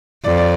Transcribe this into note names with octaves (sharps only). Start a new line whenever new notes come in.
F2 D5
D5